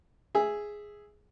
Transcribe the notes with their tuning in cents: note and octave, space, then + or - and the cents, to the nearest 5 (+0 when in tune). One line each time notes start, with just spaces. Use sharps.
G#4 +0 E5 +0